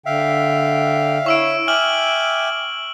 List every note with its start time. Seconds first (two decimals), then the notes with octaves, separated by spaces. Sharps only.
0.06 D3 E5 F5 G5
1.26 E4 C#5 C#6 E6 D7
1.68 E5 G5 G#5 D6 F6 D7 F#7